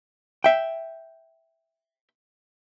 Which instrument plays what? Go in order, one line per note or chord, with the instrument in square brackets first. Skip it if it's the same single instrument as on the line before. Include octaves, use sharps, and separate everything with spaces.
[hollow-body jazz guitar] E5 G5